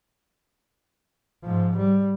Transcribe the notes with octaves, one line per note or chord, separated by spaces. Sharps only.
G#2 F3
G3